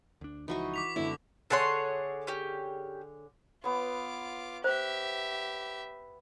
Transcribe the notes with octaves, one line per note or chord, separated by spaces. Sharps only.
D2 D4
C#2 E3 F3 D#4 F#4 C#6
D6 B6 F7
F#2 D3 G#3 B3 E4
D3 G#4 A4 C#5 F#5 C6
C#4 G4
B3 F4 C#5 D6
G4 C5 E5